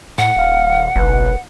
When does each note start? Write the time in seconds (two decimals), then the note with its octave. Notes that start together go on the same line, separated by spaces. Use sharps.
0.18 A2 F#5
0.36 D#1 F5
0.96 F#1 B1 B4